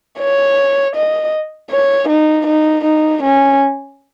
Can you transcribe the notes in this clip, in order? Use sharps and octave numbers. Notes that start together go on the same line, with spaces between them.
C#5
D#5
C#5
D#4
D#4
D#4
C#4